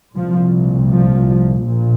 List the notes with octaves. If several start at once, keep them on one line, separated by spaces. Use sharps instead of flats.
C2 A#2 F3
F3
A#1 A#2